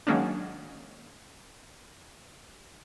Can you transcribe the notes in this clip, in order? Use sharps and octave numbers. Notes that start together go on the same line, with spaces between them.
D#3 F#3 G#3 A#3 C#4 D4